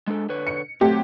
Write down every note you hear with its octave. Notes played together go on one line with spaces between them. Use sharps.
G#3 D4 A4
D3 B4 C#5
C#7
F#3 A3 C4 G4